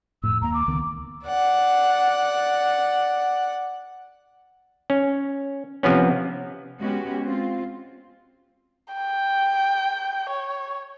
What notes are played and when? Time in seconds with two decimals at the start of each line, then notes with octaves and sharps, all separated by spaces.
0.24 F2 A2 E6
0.42 D#2 A#3 A#5
0.54 D6
0.68 C#2 D#3 B3
1.26 D5 F#5
4.90 C#4
5.83 C3 F3 B3 C#4
6.78 G#3 B3 C#4 F#4 G4
7.25 C4 F4
8.94 G5
10.29 C#5